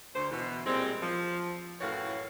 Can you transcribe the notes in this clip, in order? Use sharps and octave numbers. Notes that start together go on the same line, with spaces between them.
D2 C5
B2 E3
A#2 G3 G#3 C4
F3
F#2 A2 E3 F#4 C#5 F5